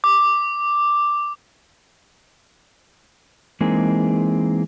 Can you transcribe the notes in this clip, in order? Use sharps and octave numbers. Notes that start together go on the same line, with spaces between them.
D6
E3 G#3 A#3 C4 D#4 G#4